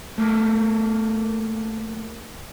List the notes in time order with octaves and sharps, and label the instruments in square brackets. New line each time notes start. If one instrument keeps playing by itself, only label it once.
[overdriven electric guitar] A3 A#3